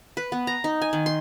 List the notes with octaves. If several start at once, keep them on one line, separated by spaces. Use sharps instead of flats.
B4
B3
A#5
D#4
G#5
D#3
C6